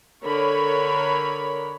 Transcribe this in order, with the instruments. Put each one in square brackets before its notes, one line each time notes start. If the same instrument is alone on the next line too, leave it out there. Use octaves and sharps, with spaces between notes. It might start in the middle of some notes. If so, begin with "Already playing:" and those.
[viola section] D3 A#4 C#5 B5